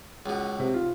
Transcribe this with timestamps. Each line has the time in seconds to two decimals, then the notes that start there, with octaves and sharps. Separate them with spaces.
0.26 C#2 B2
0.59 C3
0.74 F4